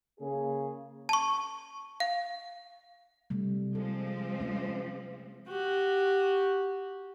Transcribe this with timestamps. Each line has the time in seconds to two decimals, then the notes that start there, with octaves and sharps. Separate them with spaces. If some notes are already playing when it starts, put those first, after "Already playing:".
0.19 C#3 A#3 G#4
1.09 A5 C#6
2.00 F5
3.30 C3 G3 A3
3.75 F3 G#3 C4 A4
4.40 A3 C#4
5.48 F#4 G4